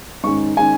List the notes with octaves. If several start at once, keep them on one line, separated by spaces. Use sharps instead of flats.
G#2 D#3 G#3 C#4 C#6
D#3 G#3 C#4 G#5